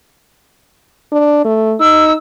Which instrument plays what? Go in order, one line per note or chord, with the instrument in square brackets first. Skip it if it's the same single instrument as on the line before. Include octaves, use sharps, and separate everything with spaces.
[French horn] D4
A3
[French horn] D#4 [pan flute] E6